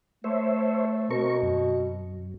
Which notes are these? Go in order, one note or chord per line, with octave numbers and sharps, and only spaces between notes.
A3 C5 C#5 E5
B2 C4 A#4 C#6
F#2